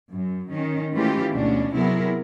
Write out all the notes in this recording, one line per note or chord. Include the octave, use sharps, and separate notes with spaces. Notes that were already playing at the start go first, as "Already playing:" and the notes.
F#2
D#3 C#4
E3 G#3 A3 C#4 F4 G4
D2 B2 C#4 D4
C3 F#3 B3 E4 G#4 A#4